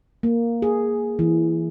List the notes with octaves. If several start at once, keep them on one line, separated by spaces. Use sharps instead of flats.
A#3
G#4
E3